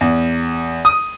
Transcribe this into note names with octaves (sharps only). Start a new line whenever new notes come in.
E2
D#6